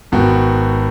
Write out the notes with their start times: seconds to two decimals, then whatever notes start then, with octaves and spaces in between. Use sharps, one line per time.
0.12 G#1 B3 F#4 G5